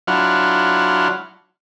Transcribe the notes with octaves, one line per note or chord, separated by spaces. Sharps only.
F#3 D4 E4 F4 F#5 F6